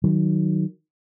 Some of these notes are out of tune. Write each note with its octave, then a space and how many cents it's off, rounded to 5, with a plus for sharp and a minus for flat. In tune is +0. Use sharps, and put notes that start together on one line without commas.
D#3 +0 F#3 +10